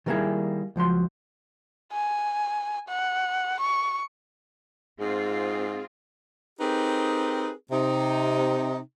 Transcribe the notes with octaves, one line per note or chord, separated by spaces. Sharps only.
D#3 G3 A#3 C#4 E4 G#4
C#2 F3 F#3 C6
G#5
F#5
C#6
G#2 C4 F4 G#4
C4 D#4 G4 G#4 A#4 B4
C3 D#4